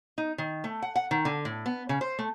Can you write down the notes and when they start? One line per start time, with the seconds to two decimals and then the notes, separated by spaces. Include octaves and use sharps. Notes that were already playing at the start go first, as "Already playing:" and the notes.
0.18 D#4
0.38 D#3
0.64 A3
0.82 F#5
0.95 F#5
1.11 D#3
1.25 D3
1.45 A2
1.66 B3
1.89 C#3
2.01 C5
2.19 A3